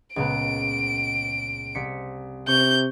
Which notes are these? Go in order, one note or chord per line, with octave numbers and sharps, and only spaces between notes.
C#2 A#2 B3 D7
C2 B6 C#7
C3 C#6 G6